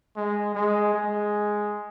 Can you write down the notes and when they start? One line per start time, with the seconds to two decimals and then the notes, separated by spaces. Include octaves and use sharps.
0.16 G#3
0.55 G#3
0.94 G#3